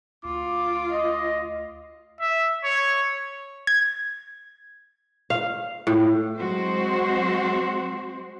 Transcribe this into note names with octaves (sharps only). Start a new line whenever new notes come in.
D2 F4 D6
D#5
E5
C#5
G#6
F5
A2
F#3 G#3 C4 F#4 C5